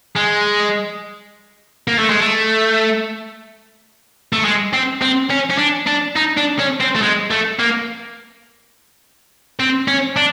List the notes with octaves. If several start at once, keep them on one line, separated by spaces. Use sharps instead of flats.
G#3
A#3
A3
G#3
A3
A3
G#3
C4
C4
C#4
C#4
D4
D4
D#4
D4
C#4
C4
A3
G#3
A3
A#3
C4
C#4
D4